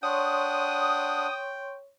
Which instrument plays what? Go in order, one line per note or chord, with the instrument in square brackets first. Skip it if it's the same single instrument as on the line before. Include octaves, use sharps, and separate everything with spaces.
[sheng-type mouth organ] D4 F#5 [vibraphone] C#5 C6 C#6 [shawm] G5 [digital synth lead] D#6